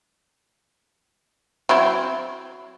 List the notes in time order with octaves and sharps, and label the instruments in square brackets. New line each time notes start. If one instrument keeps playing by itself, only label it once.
[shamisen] F#3 C4 E4